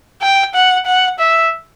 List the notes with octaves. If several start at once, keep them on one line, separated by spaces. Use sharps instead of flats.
G5
F#5
F#5
E5